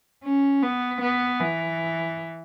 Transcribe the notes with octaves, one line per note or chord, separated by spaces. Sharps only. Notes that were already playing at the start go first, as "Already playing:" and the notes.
C#4
B3
B3
E3